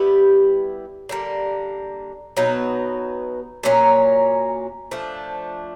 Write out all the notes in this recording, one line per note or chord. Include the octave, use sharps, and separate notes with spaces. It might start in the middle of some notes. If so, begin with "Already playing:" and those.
Already playing: G3 B3 E4 G4
D3 G3 A#3
B2 F#3 B3 D#4
A#2 F#3 A#3 C#4
F3 A3 D4